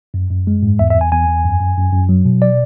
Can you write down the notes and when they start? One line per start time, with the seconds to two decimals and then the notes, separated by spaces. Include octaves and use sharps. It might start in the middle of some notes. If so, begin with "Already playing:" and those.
0.14 F#2
0.31 F#2
0.47 G#3
0.63 G#2
0.79 E2 E5
0.90 E5
0.96 E2
1.01 G#5
1.12 E2 G#5
1.28 E2
1.44 F#2
1.60 F#2
1.77 F#2
1.93 F#2
2.09 F#3
2.25 B2
2.42 D5